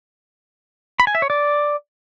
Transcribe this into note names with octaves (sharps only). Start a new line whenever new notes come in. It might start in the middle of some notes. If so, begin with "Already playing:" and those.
B5
G#5
E5
C#5
D5